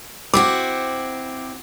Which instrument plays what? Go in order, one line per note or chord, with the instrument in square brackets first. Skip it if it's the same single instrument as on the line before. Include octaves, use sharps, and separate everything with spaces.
[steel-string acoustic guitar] C4 E4 F#4 [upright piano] D6